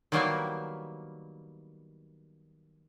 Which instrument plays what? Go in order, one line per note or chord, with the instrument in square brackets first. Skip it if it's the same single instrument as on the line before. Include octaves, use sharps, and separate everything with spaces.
[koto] D#3 F#3 G3 A#3 B3 E4